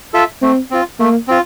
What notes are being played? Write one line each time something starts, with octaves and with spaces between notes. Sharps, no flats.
F4 A4 E5
A3 C4
C4 F4
A3 A#3
C4 F4